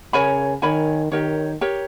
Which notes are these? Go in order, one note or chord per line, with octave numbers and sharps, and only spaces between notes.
C#3 A#4 C#5 G#5 B5
D#3 A#4 C#5 G#5 B5
D#3 G4 A#4 C#5
G4 A#4 C#5